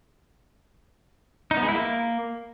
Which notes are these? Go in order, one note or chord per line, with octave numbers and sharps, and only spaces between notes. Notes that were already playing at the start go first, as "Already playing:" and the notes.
D#4
B3
G#3
E4
A#3